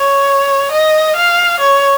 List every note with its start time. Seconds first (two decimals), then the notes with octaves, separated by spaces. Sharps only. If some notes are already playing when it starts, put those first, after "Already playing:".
Already playing: C#5
0.72 D#5
1.16 F5
1.60 C#5